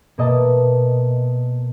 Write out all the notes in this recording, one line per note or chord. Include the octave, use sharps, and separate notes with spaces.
B2 A#3 D#5 E5 A5